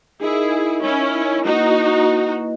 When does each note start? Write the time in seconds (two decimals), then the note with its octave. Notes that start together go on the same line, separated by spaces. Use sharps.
0.21 D#4 E4 G#4 A#4 D#5
0.83 C#4 E4
1.45 A#3 D#4 E4 F#4 B4 D#5